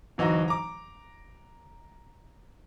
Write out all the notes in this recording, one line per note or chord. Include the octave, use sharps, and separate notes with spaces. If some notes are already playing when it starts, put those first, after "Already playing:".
D1 E3 D#4 F#4 A#5
A#5 D6